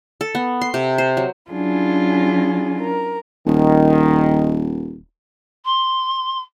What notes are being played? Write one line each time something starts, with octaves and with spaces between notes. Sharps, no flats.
A4
B3
C6
C3
C5
F#3
F#3 C#4 D4 E4 F4 G#4
A#4
D#1 D#3
C6